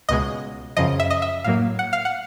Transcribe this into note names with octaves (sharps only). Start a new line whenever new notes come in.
C#2 B2 G#3 D#5
F#2 C#3 F3 D#5
E5
D#5
E5
A2 F#3 A#3 F5
F#5
F5
F#5